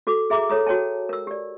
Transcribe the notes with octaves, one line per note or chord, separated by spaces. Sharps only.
F#4 A4 D6
G#4 E5 A#5 D6
A4 C#5 A#5 D#6
F#4 C#5 G5 A5
A#4 E6
G4 D5